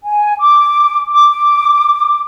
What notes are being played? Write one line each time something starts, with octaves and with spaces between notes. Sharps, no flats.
G#5
D6
D6